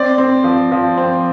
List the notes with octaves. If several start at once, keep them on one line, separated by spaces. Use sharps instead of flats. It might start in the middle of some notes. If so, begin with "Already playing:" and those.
Already playing: C4 D5
C4
F3
F3
C4